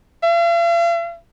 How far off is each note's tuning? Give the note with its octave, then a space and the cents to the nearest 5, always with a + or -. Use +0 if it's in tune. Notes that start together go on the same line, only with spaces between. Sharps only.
F5 -45